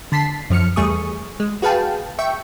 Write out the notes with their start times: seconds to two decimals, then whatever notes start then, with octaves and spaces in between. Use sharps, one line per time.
0.12 D3 A5 B6 C7
0.50 F#2 F3 F6 C#7
0.76 E2 G3 A3 G#4 C#6 D#6
1.40 G#3
1.62 F#4 G#4 B4 F5 G5 A5
2.19 E5 G5 C#6